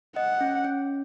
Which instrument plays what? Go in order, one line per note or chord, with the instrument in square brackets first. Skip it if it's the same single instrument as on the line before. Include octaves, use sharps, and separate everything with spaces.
[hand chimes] D#5 [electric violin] F#5
[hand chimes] C#4
C#4